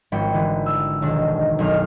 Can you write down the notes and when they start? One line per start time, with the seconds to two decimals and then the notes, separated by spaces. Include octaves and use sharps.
0.12 G#1 F3 C#4 G5 B5 C#7
0.33 D3 E3
0.66 E6
1.02 E1 B1 D#3 D4
1.59 F#1 B1 D#4 F6